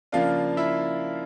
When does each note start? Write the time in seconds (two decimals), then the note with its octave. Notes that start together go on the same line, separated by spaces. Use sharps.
0.12 C#3 F3 A#3 D4 F4 F5
0.57 E4 E5